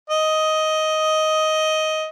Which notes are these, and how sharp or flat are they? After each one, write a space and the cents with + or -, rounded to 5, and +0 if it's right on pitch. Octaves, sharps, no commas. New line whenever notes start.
D#5 +10